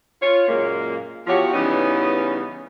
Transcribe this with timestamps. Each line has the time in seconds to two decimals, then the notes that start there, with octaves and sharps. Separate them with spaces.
0.22 F4 C#5
0.48 F#2 A#2 G#3 A#3
1.27 E2 F3 F#4 G4 C#5
1.53 C#3 E3 G3 B3 C#4 D#4